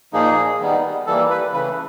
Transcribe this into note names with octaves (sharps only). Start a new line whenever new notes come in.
A#2 F3 A#3 D#4 G#4
D#3 G3 B3 D#4
E3 G3 A#3 A4
B4
C#3 E3 A3 B4